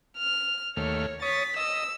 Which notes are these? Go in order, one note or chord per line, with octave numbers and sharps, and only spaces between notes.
F6
D#2 A3 C#5 F6
C#5 D#6 A6 B6
D#5 E6